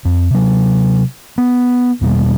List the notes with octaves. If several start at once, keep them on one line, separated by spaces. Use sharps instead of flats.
F2
C3 F#3
B3
E2 B2 G3